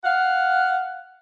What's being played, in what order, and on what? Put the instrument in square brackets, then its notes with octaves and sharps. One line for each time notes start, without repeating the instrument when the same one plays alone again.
[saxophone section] F5 F#5